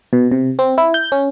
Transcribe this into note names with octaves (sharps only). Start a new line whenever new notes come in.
B2
C3
C4
E4
G6
C#4